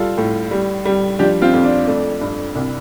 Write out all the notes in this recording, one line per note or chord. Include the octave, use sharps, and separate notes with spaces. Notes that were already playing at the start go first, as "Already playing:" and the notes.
Already playing: G3 F4 A4
A2
G3
G3
F3 D4 G4
C4 F4
F2
D4
A3 D4
G2
C2